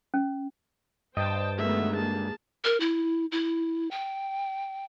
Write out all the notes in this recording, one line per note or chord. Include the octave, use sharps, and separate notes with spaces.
C#4
G2 C5 D#5 G5 A5
D3 D#3 G#3 A3 B3 E5
A#3 G#4 A5
A#4
E4
E4
G5